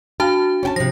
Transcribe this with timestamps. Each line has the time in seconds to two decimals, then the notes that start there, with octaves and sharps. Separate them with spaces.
0.20 D4 F#4 F5 A5
0.63 C#4 G5 A5
0.76 C3 F3 A#6